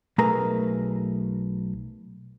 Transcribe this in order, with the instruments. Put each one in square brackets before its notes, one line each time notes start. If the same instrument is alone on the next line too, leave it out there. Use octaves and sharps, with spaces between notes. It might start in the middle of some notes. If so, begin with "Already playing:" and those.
[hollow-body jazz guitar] B1 A3 G#4 A#4 B4 A#5